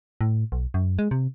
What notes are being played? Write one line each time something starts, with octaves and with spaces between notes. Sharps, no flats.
A2
B1
F#2
G#3
C3